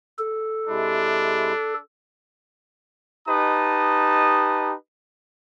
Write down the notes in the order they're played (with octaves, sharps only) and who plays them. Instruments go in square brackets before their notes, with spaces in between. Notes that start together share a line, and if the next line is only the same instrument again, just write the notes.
[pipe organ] A4
[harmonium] C3 G#3 E4 [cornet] D4
[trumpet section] D#4 G4 B4 D#5 A5 D#6